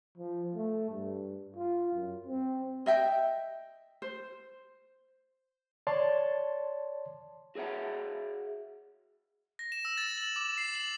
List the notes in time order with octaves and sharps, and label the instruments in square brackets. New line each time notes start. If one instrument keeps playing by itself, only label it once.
[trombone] F3
A3
G2
F4
F#2
C4
[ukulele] D#5 E5 G5
C5
[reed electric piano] C#5 D5 A5 C6
[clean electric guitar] F#4 G#4 C#5 E5 F#5
[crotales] A#6
E7
E6
A6
F#7
D6
C7
F#7